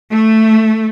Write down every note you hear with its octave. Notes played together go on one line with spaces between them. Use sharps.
A3